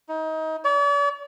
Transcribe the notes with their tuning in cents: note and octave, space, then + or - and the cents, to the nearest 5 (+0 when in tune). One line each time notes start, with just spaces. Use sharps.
D#4 +30
D5 -45